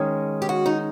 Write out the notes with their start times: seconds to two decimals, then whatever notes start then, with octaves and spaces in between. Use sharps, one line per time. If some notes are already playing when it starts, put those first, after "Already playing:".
Already playing: D#3 G#3 C#4
0.42 G4
0.49 F#4
0.66 D#4